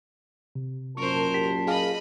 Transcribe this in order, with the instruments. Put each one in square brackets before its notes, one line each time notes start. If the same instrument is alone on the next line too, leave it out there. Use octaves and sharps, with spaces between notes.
[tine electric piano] C3
[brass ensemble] F#2 A#2 A5 [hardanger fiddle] A#4 C5 [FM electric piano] C#6
[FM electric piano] G4 [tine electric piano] B6
[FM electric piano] F4 G#4 F5 [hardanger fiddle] D#5 B5